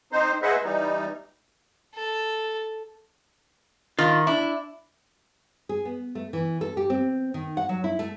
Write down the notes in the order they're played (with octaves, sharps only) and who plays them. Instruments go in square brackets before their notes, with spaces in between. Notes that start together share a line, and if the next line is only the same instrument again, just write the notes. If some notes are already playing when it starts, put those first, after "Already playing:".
[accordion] C4 D#4 C5
G#4 B4 C5 D#5 E5 F#5
E3 G3 D#4
[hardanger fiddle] A4
[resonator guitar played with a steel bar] D#3 [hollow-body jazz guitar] F4
[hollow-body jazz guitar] D4 [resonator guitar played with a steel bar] E4
[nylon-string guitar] G#4
B3
A3
E3
A4
G4
C4
D#3
F#5
F#3
E4
A3